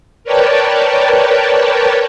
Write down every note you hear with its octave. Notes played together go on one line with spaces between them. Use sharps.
A#4 B4 C#5 D5 G5 A5